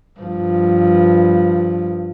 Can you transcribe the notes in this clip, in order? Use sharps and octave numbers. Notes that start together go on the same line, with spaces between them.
G2 F3